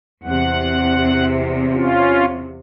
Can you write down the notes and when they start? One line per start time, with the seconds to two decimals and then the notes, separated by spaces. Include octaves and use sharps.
0.23 E2 C3 F#5
1.72 C#4 F4